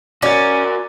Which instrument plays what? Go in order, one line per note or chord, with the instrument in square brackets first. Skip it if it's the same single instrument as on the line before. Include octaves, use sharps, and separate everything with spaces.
[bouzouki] C#4 [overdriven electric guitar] F#4 A#4 [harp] D5 A6